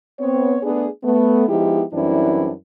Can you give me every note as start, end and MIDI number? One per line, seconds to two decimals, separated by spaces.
0.20 0.58 59
0.20 0.58 60
0.20 0.58 73
0.63 0.88 57
0.63 0.88 59
0.63 0.88 62
0.63 0.88 68
1.04 1.45 57
1.04 1.45 59
1.49 1.84 53
1.49 1.84 56
1.49 1.84 59
1.49 1.84 63
1.49 1.84 64
1.49 1.84 67
1.93 2.52 42
1.93 2.52 52
1.93 2.52 55
1.93 2.52 60
1.93 2.52 62
1.93 2.52 64